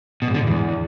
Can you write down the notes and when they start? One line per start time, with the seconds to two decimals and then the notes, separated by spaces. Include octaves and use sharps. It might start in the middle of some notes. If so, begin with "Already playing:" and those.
0.22 B2
0.28 G#2
0.34 D3
0.41 G#2
0.47 E2